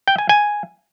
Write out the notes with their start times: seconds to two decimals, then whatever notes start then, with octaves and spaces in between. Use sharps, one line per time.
0.08 G5
0.18 G#5
0.29 G#5